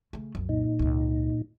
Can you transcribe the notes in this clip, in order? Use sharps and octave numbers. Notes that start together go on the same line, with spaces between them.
C#3 A3
C2 F#2
A#2 D#4
C#2 G#2